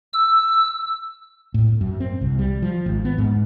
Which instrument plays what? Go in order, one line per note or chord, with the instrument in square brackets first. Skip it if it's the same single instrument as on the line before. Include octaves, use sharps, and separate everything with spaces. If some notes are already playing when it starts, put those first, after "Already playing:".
[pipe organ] E6
[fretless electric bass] A2
F#2
C4
C2
G3
F3
G#1
B3
G#2